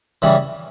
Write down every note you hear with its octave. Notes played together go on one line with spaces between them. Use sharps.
C#3 E3 G3